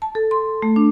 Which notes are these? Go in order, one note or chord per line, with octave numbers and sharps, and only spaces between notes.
A5
A4
C6
A3
D4